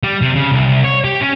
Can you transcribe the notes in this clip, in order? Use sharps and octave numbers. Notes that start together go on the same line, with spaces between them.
G3
C3
C#3
C2
C#5
G4
C#4